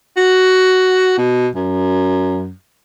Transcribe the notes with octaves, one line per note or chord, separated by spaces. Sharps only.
F#4
B2
F#2